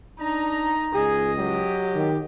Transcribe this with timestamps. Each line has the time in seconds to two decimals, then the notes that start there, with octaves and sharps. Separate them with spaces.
0.20 D4 D#4 A#5
0.95 C#2 G#4 D#5
1.38 F#3 G4
1.95 D#3